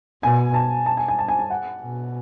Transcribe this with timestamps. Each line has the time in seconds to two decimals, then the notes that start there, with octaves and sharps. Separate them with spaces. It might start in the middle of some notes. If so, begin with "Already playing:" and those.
0.23 B2 G#5
0.54 A5
0.86 A5
0.97 G#5
1.08 G#5
1.19 A5
1.28 G#5
1.39 A5
1.50 F#5
1.82 B2